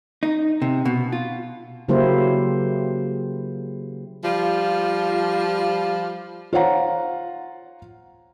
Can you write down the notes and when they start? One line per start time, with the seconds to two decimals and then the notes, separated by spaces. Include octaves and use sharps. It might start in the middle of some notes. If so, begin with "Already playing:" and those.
0.23 D#4
0.62 C3
0.85 B2
1.12 F4
1.88 C#3 F#3 A#3 E4 G4 C5
4.24 F3 G3 F4
6.53 F4 C5 C#5 F5 F#5 A#5